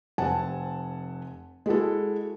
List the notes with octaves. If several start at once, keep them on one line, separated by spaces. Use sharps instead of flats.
F1 C4 F#5 G#5 A5
G#3 E4 F#4 A4